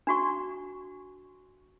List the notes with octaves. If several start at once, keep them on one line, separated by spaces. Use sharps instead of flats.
D4 F#4 C#6